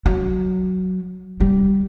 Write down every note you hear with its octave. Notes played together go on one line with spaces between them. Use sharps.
F#3
G3